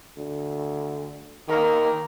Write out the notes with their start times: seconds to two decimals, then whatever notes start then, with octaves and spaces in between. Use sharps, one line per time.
0.17 D2
1.48 D#3 A#3 A#4